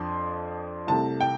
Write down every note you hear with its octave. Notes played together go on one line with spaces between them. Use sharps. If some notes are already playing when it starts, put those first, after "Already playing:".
Already playing: F2 F3 D4 C6
C2 C3 A3 A5
G5